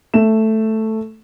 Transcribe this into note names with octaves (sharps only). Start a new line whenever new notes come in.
A3 E7